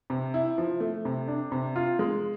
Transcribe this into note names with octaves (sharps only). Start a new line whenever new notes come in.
C3
E4
F3
A3
C3
D4
C3
F4
G#3